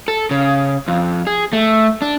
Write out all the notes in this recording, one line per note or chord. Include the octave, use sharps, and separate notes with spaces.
A4
C#3
F2
G#4
A3
D4